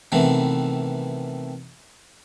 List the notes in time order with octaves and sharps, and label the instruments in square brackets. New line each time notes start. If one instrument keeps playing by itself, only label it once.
[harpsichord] C3 D#3 E3 A3 B3